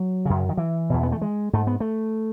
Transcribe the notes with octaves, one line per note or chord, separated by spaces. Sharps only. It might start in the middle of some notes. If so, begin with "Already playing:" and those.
Already playing: F#3
F#2 C#3
D#3
E3
E2 B2
B3
A3
G#3
G#2 A3
B3
A3